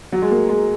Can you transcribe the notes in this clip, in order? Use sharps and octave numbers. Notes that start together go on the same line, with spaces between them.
F#3
G#3
A#3
G#3